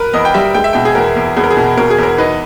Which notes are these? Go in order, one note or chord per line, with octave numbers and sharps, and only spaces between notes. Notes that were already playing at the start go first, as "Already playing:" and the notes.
Already playing: A#4 B4
E2 D#5
G5
G3 E5
G#3 G5
E5
B2 G5
G#4
E2 A#4
E2
E2 G#4
A#4
G#4
B2
B2 A#4
G#4
E2
A#4
D#4 B4